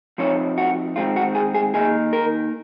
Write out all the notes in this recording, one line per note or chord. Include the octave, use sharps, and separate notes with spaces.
F3 C4 D#4 C#5
F#4
D#3 G#3 C4 F4
F#4
G#4
G#4
D#3 A#3 D#4 G#4
A#4